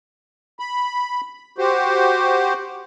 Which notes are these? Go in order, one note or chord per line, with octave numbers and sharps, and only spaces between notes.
B5
F#4 G4 C5